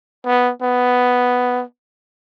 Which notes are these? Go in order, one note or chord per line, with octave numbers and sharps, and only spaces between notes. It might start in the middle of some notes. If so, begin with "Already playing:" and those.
B3
B3